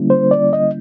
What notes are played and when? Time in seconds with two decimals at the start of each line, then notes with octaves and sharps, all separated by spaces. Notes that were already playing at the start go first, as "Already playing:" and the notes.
Already playing: D3 G3 A#3 C#4 E4
0.10 C5
0.31 D5
0.53 D#5